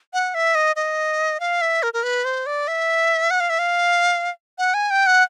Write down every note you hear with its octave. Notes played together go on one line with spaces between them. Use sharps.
F#5
E5
D#5
D#5
F5
E5
A#4
A#4
B4
C5
D5
E5
F#5
F5
E5
F5
F#5
G#5
G5
F#5